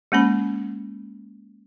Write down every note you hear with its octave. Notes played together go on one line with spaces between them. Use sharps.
G#3 A#3 C#4 B5